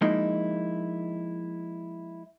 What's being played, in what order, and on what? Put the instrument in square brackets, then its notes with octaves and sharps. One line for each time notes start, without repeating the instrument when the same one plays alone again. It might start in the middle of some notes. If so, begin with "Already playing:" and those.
[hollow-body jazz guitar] F3 G#3 A#3 D#4 E4